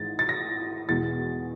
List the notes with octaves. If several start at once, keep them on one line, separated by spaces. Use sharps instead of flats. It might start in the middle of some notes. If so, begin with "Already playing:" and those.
Already playing: G#1 G#2 E3 A6
A6
A#6
E2 B2 G#3 A6